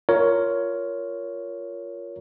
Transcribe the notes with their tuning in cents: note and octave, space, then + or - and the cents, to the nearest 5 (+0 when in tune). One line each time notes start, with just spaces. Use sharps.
F4 +0 A#4 +0 C#5 +15